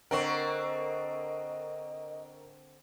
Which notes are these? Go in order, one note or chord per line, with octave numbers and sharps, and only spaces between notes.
D3 C4 A#4 D#5 C#6